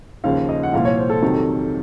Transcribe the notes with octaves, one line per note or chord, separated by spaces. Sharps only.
D#2 C#3 F3 F5
D#5
F#5
C2 A#2 F3 F5
C#5
C5
A4
F2 C3 D#3 F#3